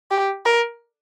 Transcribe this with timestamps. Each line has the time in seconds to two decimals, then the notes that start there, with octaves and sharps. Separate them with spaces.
0.11 G4
0.46 A#4